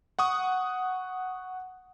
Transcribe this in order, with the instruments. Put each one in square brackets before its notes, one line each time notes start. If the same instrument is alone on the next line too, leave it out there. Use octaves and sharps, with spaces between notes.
[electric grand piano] F#5 C#6 D#6